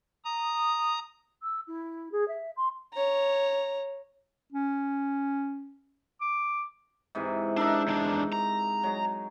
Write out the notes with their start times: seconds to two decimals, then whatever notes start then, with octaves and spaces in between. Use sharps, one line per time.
0.25 A#5 D#6
1.43 E6
1.68 E4
2.12 G#4
2.28 E5
2.57 C6
2.94 C#5 A#5
4.52 C#4
6.21 D6
7.15 G#2 C3 E3
7.57 D4 D#4 A#4 E5
7.88 E2 D4
8.33 A#5
8.84 F#3 G#3